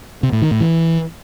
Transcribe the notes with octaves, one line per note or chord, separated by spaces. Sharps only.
C3
A2
D#3
A2
E3